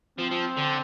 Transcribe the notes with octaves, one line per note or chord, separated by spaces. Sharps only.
F3 C4
F3
D3